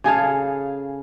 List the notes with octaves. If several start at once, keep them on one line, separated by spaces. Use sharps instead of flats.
C#3 G#4 A4 F5